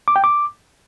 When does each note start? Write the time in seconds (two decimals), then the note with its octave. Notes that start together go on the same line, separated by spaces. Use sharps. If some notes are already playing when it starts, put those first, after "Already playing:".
0.08 D6
0.16 G5
0.24 D6